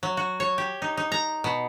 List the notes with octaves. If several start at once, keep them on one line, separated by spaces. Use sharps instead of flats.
F#3
F#4
C#5
G4
D#4
D#4
A#5
B2